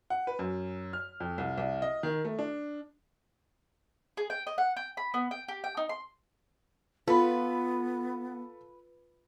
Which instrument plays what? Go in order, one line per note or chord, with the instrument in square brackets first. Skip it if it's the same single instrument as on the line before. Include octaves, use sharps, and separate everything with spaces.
[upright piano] F#5
B4
F#2
F6
F2
C2
C2
D#5
D#3
A3
D4
[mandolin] G#4
G5
D#5
F#5
G5
B5
B3
G5
G4
G5
D#4
C6
[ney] B3 [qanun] F4 [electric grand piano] A4 B5 [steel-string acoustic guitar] B4